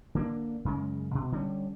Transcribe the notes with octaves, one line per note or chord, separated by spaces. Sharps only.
D3 A#3 D4
F#2 C#3 G#3
B2
D3 G3 C#4